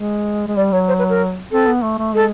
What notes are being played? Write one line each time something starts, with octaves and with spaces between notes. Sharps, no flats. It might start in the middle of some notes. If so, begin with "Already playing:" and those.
Already playing: G#3
G#3
G3 D5
F#3 C#5
C5
B4
A#4
C4 A4
B3
A3
A3
G#3 A4